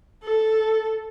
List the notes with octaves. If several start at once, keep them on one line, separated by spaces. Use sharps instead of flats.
A4